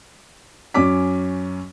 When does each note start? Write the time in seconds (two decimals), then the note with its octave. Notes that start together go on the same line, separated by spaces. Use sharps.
0.74 F#2 C#4 D6 B6